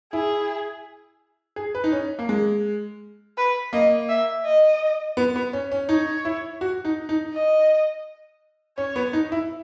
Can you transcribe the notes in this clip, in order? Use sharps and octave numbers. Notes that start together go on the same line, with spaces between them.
E4 G#4
G#4
B4
D#4
C#4
A#3
G#3
B4
A#3 D#5
E5
D#5
B3
B3
C#4
C#4
D#4 C#5
E4
F#4
D#4
D#4
D#5
C#4 C#5
B3
D#4
E4